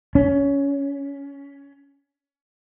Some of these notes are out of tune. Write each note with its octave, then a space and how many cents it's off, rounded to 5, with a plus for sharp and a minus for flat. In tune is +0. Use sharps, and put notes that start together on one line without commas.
C#4 +15